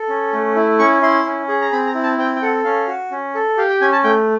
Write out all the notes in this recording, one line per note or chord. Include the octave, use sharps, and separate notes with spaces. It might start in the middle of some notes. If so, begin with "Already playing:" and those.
Already playing: A4
C#4
A3
E4
C#4 C#6
E4 C6
C#4
G#4
A#5
C4 B5
A#5
E4
A5
C4 G5
G5
A4 F#5
C#4 F5
F#4
C#4
A4
G4 F5
G5
C#4 G#5
A5
A3 G5